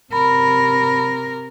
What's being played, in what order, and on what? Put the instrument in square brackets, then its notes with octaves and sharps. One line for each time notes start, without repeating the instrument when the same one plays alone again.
[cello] C3 A#4 [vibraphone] B5